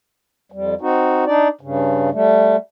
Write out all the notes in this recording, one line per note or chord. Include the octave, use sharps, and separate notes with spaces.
F2 G3
C4 D#4 F#4
D4 D#4 D5
G2 C#3
G3 A3